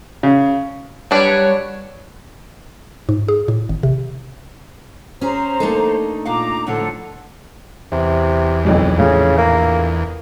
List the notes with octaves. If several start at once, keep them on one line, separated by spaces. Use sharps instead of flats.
C#3
F#3 G3 D4 B4 C#5
G#2
G#4
A2
G#1
C3
C#4 G#4 C5 A#5
A3 A#3 D4 D#4 A4
A#2 F5 F#5 A#5 D6
A2 D3 F3 A4 F#5
E2 C3
F#1 B1 F2
A#1 A2 C#3
A#3